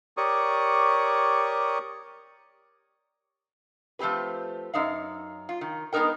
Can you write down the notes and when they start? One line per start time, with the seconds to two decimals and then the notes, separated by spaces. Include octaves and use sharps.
0.17 G4 A#4 C#5 D5 C#6 D#6
3.99 F3 A3 C4 G4 B4
4.74 F#2 D#4 F5
5.49 F4
5.61 D#3
5.93 G#3 B3 D4 D#4 A#4 G5